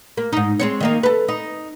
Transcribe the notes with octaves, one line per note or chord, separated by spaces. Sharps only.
A#3
G#2 D#4
G#3 C4 C#5
D#3 A#3 D#4
A4 B4
D#4